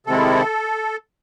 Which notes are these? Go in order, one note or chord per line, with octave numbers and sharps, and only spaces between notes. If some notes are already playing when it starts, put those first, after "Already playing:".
C3 D#3 G#3 C4 E4 A4